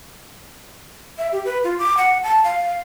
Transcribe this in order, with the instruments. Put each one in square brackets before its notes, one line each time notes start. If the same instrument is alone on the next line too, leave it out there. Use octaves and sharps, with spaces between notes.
[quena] E5
G4
B4
F4
D6
F#5
A5
F5